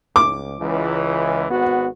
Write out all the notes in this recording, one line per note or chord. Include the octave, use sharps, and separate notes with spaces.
C#2 D6
C#2 E3
G#1 B3 F#4